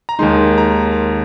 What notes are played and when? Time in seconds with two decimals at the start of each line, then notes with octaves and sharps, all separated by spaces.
0.09 A#5
0.19 D#2 D#3 G#3 D#4 C6
0.58 A#5